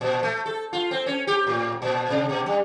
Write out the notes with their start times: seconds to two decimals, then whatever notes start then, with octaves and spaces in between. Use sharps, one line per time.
0.01 A#2
0.23 A3
0.46 A4
0.73 F4
0.91 C4
1.06 C#4
1.27 G4
1.47 A2
1.82 A#2
2.10 C3
2.29 B2
2.46 G3